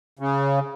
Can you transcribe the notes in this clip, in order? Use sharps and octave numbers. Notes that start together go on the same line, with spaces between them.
C#3